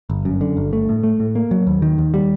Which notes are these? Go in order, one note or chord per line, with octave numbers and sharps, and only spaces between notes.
G1
F#2
D3
G1
A3
A2
A3
A2
A#3
F#3
D#2
D#3
D#2
G3